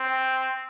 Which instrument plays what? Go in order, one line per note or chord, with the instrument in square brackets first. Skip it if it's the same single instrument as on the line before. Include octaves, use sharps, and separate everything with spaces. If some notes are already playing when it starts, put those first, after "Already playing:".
Already playing: [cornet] C4